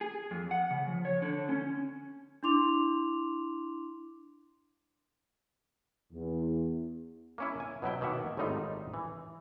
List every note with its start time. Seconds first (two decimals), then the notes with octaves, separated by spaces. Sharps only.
0.01 G#4
0.31 F2
0.51 F#5
0.71 C#3
0.87 F3
1.05 C#5
1.22 D3
1.49 C#4
2.43 D4 E4 C6 D6 F7
6.13 E2
7.38 A#3 C#4 E4
7.60 G#5
7.82 B2 F#3 E4 G5
8.01 B2 D#3 A#3 E5 F#5
8.37 G#1 A2 G3 D#4 F4
8.94 E3